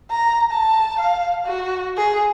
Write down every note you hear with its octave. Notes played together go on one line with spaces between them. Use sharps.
A#5
A5
F5
F#4
G#4